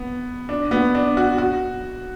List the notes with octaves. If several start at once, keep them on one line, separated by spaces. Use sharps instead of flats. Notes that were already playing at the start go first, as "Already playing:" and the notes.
Already playing: B3
D4
B3
D4
F#4
F#4